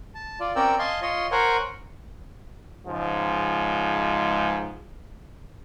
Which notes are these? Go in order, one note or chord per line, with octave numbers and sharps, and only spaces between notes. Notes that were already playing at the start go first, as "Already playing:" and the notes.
A5
F4 D5
C4 C#4 A#4 D5 G5 E6
D#5 F5 G#5 A5 C6
F4 C#5 D#5 C6
A#4 C5 C#5 F#5 G#5
C#2 G#2 F3 G#3